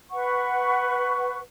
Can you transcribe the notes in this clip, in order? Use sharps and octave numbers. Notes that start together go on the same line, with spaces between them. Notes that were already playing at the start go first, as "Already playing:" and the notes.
B4 F#5 C#6